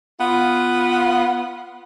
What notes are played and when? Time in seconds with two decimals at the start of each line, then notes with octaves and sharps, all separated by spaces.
0.19 B3 F4